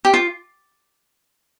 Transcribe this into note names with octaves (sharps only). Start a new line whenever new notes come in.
G4
F4